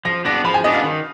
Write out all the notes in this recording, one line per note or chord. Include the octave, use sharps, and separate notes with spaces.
F3 A#6
B3 D4 A#6
F3 B5
G#5
B3 D4 D#5
F5
D#3